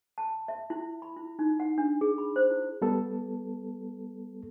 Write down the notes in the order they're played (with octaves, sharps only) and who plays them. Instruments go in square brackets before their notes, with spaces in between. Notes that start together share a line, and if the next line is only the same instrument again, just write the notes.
[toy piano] A5
E5
E4
B5
E4
D#4
F#5
D4
G#4
B5
C5
E4
[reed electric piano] G3 B3 A4